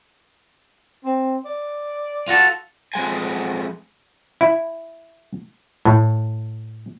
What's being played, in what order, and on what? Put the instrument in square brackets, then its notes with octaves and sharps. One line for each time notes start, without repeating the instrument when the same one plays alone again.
[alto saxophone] C4
D5
[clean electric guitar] F4 F#4 A4
[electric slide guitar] F2 G#3 G#5
[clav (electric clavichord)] E4
A2